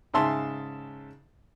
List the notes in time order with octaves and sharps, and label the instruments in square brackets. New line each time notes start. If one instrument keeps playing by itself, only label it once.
[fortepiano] G#2 C#3 E5 A5 C6